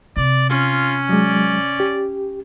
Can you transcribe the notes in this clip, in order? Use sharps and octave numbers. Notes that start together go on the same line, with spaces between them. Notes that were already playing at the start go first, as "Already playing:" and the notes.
C3 D5
C#4 F4
F#3 G#3 D5
G4